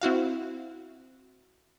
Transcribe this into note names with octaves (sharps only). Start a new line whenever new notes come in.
C4 E4 F#4 F5